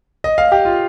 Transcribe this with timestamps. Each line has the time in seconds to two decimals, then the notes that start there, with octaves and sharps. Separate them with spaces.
0.24 D#5
0.38 F5
0.52 G4
0.65 F4